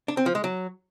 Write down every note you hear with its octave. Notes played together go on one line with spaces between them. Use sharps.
D4
C4
F3
G#3
F#3